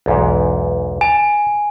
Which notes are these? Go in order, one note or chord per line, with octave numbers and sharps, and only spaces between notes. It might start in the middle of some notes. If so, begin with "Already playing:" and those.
B1 E2 G#2
G#5 A5